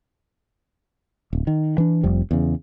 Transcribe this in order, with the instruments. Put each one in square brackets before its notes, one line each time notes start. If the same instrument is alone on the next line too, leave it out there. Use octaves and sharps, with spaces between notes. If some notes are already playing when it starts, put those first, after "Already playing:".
[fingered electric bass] D1
D#3
E3 D4
F1 F2 F3 G3
E2 C#3